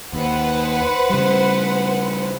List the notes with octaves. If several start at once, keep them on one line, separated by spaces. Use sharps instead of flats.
D#2 B4 C5 F#5
C#3 G3